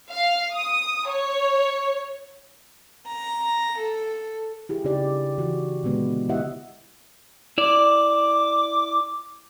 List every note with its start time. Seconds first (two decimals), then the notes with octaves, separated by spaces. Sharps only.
0.12 F5
0.53 D#6
1.09 C#5
3.08 A#5
3.79 A4
4.69 E4 G4 G#4
4.84 C#3 D4 D#4 G4 D5
5.38 E3 F#4
5.84 A#2 D3 G#3 B3
6.29 E4 G4 D#5 E5 F#5
7.58 E4 D5 D6